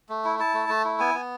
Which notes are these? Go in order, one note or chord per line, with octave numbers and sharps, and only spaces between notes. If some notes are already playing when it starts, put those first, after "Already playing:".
A3
E4
E4 A5
A3
A3
E4
B3 G#5
B3